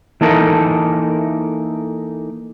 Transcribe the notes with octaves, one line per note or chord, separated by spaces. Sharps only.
E3 A#3 D#4 A4 A#4